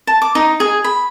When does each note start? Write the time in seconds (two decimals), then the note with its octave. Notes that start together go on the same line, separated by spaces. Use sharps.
0.07 A5
0.22 D6
0.35 D#4
0.60 G#4
0.84 B5